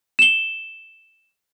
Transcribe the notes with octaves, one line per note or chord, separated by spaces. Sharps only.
E7 G7